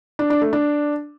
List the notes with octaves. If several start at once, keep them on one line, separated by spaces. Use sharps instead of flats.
D4
D4
A3
D4